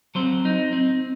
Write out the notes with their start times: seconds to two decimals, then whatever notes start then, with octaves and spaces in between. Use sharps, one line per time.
0.15 F#3 C4 C5
0.45 D#4
0.73 C4